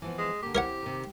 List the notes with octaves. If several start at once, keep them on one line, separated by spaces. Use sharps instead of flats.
E3 F3 B3
G#3
D3 A#3 G4
C4 E4 G4 A#4 C#5 F#5
C3 D#3